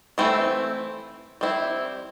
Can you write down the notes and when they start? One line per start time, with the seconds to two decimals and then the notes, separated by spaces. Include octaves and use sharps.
0.18 E3 A3 C4 E4
1.41 G3 C4 E4